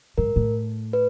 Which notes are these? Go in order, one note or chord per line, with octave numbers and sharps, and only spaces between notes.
G#2 A#4
A2
B4